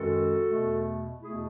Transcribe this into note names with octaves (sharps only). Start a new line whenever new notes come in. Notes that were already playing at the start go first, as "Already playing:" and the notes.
Already playing: F#2 D#3 G#3 F#4 A4
E2 B2 A3
E2 B2 A3 E4 G#4